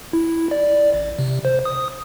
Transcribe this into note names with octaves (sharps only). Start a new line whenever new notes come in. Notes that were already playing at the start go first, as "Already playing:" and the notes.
E4
D5
A1
C3
C5
D#6